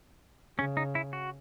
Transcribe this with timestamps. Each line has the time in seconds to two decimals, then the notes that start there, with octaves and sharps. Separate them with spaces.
0.58 C#3 C#4
0.77 D#4
0.95 E4
1.13 F#4